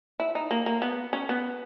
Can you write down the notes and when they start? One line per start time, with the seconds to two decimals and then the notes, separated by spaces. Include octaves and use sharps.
0.20 E4
0.35 D#4
0.51 A#3
0.66 A#3
0.82 B3
1.13 C#4
1.29 B3